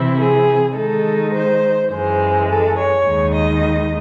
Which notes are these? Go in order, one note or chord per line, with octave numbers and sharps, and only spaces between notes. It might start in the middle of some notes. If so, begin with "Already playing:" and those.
Already playing: C3 E3 C4 E4
G#4
D#3 G#3 D#4 A4
C5
F#2 E3 G#3 C5
A4
C#5
D#2 D#3 G#3 D#4
D#5